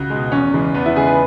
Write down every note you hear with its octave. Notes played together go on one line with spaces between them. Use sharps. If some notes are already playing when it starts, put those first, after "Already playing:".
Already playing: C#2 F#4
B2 G#3
E2 C#4
C#3 E3 G#3
E2 B3
E4
C#3 G#3 G#4
B4